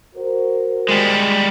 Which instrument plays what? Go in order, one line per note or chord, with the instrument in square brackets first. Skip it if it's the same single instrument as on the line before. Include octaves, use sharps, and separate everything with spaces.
[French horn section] F#4 A#4 C5
[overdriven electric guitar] G3 G#3